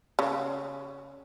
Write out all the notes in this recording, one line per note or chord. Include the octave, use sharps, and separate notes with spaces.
C#3